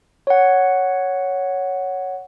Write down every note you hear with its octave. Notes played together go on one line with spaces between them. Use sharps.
C#5 F#5